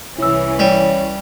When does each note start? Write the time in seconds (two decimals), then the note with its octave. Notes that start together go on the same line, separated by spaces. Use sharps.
0.18 C2 E3 C#4 E4 E6
0.59 G3 C#5